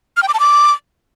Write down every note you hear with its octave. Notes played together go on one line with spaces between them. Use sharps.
F6
G5
D6
A5
D6